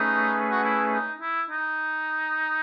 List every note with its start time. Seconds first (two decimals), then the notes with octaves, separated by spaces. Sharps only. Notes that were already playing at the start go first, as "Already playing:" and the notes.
Already playing: A3 C#4 D#4 G#4 B4
0.51 F#4
0.64 E4
0.92 D#4
1.21 E4
1.50 D#4